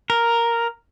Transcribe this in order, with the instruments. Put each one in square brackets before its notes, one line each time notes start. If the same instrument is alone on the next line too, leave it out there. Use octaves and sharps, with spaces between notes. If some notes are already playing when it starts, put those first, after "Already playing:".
[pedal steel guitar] A#4